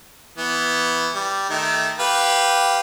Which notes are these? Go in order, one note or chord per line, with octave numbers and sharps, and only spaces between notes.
E3 B3
G3
D#3 A3
G4 B4 F5